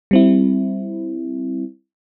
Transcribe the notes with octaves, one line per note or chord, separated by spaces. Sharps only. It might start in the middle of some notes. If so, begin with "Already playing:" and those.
G3 C4 E4